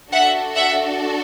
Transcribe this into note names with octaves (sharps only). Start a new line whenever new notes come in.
D4 F#4 A4 E5 F#5
E5 F#5